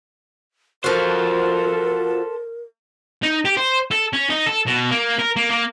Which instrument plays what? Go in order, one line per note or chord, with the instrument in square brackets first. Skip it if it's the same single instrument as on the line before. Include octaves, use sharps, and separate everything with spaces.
[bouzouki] F3 F#4 [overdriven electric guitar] A4 C5 [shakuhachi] A#4
[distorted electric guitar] D#4
G4
C5
A4
C#4
D#4
A4
B2
A#3
A#4
A#3
A#3